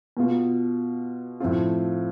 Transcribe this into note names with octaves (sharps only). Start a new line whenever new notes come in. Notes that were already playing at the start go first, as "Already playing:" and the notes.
B2 B3 F4
A2 F3 C4 F4